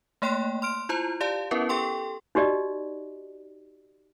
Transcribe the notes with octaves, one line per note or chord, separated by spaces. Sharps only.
A3 A#3 C#5 G5 C6 F#6
C6 F6 D7
E4 F4 C5 A#5
G4 D5 F5 A5
B3 C#4 E4 A#4 B4
G4 A4 G5 C6 C#6
D#4 F#4 G4 D5 D#5